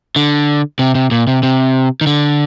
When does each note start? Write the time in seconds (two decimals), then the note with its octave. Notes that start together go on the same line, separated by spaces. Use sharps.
0.16 D3
0.79 C3
0.95 C3
1.11 A#2
1.27 C3
1.43 C3
2.01 D#3
2.07 D3